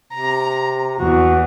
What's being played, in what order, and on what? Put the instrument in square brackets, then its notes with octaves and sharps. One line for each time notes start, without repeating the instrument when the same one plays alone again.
[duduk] C3 [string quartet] A#5
[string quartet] E2 [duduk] F#4